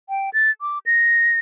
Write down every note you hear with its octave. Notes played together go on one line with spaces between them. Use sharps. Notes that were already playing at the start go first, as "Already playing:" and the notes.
G5
A6
D6
A#6